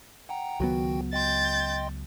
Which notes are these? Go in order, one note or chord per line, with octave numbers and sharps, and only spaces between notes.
F#5 G5 A#5
C#2 D#3 F#3 B3 F#4 G5
D#5 G5 C6 G6 A6